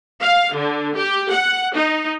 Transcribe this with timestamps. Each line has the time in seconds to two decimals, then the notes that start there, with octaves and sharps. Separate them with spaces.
0.21 F5
0.54 D3
0.97 G4
1.31 F#5
1.75 D#4